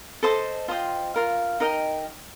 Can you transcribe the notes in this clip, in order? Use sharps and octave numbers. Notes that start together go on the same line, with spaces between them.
A4 C5 D#5 A5
F4 C5 D#5 G5
F4 A#4 F5
D#4 A#4 D#5 G5